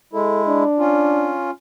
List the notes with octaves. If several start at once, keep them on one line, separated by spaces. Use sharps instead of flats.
G#3 E4 A4
D4
C#4 F4